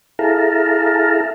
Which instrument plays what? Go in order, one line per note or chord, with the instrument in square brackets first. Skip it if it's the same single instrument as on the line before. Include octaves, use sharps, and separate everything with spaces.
[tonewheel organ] E4 G#4 A4 F5 A5 A#5